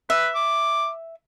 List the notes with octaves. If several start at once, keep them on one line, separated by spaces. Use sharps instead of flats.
B4 E5
D6